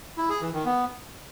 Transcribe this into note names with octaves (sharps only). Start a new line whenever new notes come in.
E4
G#4
E3
D#3
B3